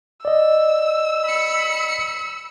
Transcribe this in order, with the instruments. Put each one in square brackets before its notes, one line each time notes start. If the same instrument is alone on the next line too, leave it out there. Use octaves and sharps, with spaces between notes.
[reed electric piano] D5 D#5 [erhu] E6
[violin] B5 C#7